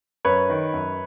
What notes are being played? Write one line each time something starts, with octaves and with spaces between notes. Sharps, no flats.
F#2 B4 C#5
D#3
F#2